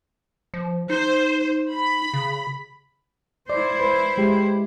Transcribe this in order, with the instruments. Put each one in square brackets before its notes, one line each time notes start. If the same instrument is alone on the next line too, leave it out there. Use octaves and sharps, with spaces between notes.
[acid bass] F3
[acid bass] D#4 [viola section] C5
[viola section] B5
[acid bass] C#3
[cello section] E4 C5 [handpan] D5
[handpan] B4
G#3 G4